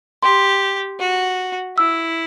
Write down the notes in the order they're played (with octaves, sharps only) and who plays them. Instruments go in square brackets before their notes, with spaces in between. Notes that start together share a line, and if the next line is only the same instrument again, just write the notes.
[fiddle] G4 [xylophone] C6
[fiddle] F#4
[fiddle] E4 [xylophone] E6